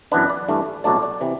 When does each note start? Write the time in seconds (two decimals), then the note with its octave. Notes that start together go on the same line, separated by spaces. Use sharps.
0.12 F#2 E3 B3 D4 B4
0.30 D5
0.48 G2 E3 A3
0.84 C2 B2 F#3 A3 D4 D5
1.03 D5
1.21 C3 E3